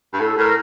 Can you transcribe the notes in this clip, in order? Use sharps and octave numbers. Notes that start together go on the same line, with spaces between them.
G2
A2 A4
A2 A#4